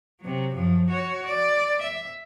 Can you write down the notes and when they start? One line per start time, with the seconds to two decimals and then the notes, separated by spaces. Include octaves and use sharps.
0.21 C3 F#3
0.55 F#2 F3
0.89 F#4 C#5
1.25 D5
1.81 E5